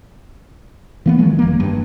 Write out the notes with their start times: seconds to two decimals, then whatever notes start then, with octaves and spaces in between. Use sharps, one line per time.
1.06 E3 A#3 B3
1.19 D#3 F3 F#3 G#3
1.39 F1 A#3
1.60 G2